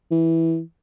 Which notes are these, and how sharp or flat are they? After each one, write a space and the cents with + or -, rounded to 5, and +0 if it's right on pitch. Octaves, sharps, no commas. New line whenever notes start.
E3 -10